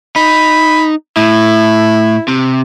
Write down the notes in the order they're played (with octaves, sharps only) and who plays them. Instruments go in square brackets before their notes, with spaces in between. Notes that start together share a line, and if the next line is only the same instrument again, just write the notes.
[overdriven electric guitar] D#4 [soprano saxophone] B5
[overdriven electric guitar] A2 [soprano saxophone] E4
[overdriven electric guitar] C3